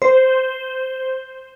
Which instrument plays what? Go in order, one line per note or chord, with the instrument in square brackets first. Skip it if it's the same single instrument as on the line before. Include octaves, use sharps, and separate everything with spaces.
[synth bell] C5